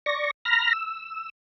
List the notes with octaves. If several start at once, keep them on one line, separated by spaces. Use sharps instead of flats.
D5 C#6 A#6
A#5 B5 F6 A#6
E6